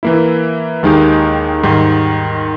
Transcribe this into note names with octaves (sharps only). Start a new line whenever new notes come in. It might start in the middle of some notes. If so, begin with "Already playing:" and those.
E3 A#3 E4
D#2 D#3 G#3 D#4 G4
G#2 D#3 G3